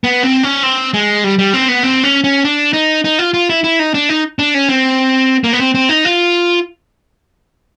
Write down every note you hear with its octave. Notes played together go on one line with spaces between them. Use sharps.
B3
C4
C#4
C4
G#3
G3
G3
C4
B3
C4
C#4
C#4
D4
D#4
D#4
F4
F4
E4
E4
D#4
D4
D#4
D4
C#4
C4
A#3
B3
C4
C4
D#4
F4